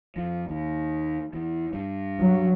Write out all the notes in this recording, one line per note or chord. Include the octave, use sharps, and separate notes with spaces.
F2
D#2
E2
G2
F#3